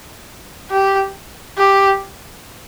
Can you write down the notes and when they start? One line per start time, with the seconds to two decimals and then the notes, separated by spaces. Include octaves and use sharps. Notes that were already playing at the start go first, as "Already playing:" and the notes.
0.71 G4
1.58 G4